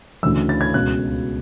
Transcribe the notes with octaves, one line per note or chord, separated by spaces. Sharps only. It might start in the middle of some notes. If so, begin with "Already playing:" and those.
D2 C#3 E3 E6
A6
G#6
C#2 B2 F#6